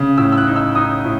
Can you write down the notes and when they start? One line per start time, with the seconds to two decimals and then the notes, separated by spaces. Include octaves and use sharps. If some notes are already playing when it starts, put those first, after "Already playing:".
Already playing: C#3
0.17 A2 E6
0.32 E6
0.37 F#6
0.47 D#4
0.56 E6
0.75 D#4 D#6
1.04 A2